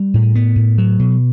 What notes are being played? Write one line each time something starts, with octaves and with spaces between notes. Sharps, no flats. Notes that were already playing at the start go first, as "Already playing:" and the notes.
Already playing: G3
A2
B3
A2
F#3
B2